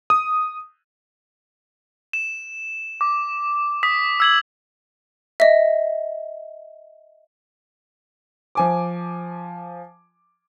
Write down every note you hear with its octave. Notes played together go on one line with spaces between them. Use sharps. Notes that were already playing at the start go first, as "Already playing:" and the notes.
D#6
E7
D6
D#6 B6
E6 G#6 F#7
D#5 E5
F3 G#5 D6